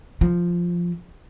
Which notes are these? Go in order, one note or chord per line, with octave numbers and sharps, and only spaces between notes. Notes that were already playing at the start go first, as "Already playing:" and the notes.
F3